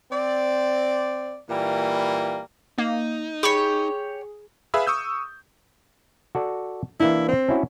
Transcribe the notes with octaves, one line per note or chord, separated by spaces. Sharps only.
C4 D5
A#2 E3 G3 A#3
A#3 D#4
G4 G#4 C#5 B5 C#6
G#4 B4 E5 F5 B5 E6
C#6 D#6 E6 G6
F#4 A4 D5
E3 A#3 D4 E4
C4
C#4 E4 F#4